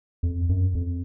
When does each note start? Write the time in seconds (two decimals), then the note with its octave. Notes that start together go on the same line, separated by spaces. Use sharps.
0.23 F2
0.49 F#2
0.75 F2